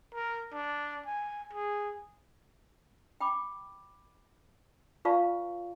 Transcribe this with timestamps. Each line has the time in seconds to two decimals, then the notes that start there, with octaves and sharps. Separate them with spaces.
0.14 A#4
0.54 D4
1.06 G#5
1.53 G#4
3.21 G5 B5 D6
5.05 F4 B4 D5 F5 A5 C#6